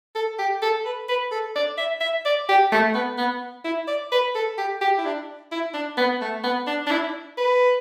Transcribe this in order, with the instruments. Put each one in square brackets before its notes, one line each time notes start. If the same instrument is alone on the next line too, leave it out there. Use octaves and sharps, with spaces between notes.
[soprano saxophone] A4
G4
A4
B4
B4
A4
D5
E5
E5
D5
G4
A3
B3
B3
E4
D5
B4
A4
G4
G4
E4
D4
E4
D4
B3
A3
B3
D4
D4
E4
B4